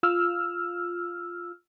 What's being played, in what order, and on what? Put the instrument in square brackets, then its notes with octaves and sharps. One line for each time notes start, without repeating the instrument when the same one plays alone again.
[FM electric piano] F4 E6 F6